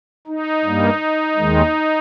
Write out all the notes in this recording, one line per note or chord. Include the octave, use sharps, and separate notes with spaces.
D#4
G2 G3 A#3
D#2 D#3 G#3